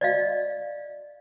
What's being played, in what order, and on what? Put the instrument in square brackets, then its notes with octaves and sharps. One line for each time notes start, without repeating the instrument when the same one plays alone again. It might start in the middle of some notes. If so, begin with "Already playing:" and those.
[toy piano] D5 D#5 F5